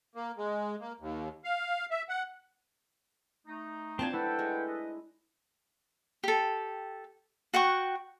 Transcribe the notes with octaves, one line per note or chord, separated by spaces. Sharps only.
A#3
G#3
A#3
D#2
F5
E5
F#5
A3 D#4
C4 D4 F4 C5 G#5 A5
A3 E4 A4 B4 F#5 G5
G#3
B4 D#5
G4 A4
F#4 F#5 G5 C#6